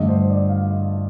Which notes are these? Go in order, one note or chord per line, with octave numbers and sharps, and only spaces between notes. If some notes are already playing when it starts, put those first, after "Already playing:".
Already playing: G2 D3 A3 D#5
C5
D5
F5
D#5